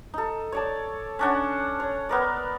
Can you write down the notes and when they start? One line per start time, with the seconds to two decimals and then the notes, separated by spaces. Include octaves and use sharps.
0.14 D#4 A4
0.52 C#5 D5 A5
1.19 C#4 D4 F#5
1.80 C#5
2.09 B3 A#4 D5